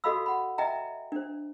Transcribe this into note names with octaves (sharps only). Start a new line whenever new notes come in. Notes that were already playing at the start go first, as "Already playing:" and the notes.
F#4 A4 D#5 F5 B5 E6
F#5 B5
D#5 E5 G5 A#5
D4 C5